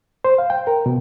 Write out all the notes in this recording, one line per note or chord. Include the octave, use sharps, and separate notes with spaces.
C5
F5
G5
A#4
B2